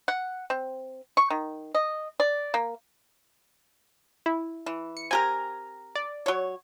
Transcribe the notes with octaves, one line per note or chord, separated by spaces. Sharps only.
F#5
C4
C#6
D#3
D#5
D5
A#3
E4
E3
C#7
C4 G4 A#4 G#5 A#5
D5
F#3 C#5